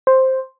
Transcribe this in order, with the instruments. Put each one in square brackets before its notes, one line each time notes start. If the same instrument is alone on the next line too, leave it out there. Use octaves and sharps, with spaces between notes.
[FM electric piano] C5